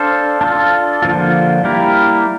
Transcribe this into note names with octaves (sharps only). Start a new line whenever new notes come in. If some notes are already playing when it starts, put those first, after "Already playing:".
Already playing: D4 A4 C5 F5
D4 F4 A4
D3 F3 A#3 F4
G3 A#3 E4 G4 A#4